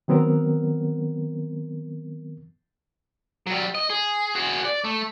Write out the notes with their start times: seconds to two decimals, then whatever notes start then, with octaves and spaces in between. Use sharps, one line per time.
0.08 D#3 F#3 B3 C4 A#4
3.47 F#3 G3
3.75 D#5
3.90 G#4
4.35 F#4 G#4
4.65 D5
4.84 A3